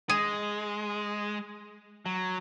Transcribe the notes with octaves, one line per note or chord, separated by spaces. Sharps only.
G#3 G#4
F#3